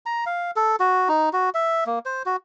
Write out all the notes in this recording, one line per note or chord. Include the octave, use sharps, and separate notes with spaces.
A#5
F5
A4
F#4
D#4
F#4
E5
A#3
C5
F#4